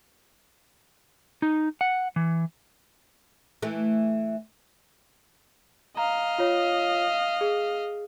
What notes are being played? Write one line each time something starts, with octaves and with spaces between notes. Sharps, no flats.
D#4
F#5
E3
E3 A3
D#5 F5 A#5
F4 C#5
G#4